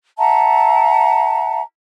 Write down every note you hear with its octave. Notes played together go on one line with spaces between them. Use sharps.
E5 F#5 A5 A#5